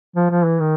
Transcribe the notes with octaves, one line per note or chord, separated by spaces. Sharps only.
F3
F3
E3
D#3